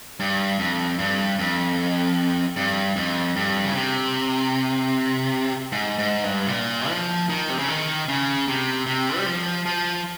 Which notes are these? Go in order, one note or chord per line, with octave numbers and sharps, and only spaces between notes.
G2
F2
G2
F2
G2
F2
G2
C#3
C3
G#2
G#2
G2
C3
A#2
F3
D#3
C3
C#3
D#3
C#3
C3
C3
G3
F3
F3